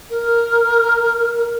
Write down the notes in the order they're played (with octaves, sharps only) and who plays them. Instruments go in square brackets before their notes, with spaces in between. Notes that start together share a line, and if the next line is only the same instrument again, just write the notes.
[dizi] A#4